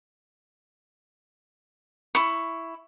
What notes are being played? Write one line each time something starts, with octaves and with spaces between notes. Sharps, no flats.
E4 C#6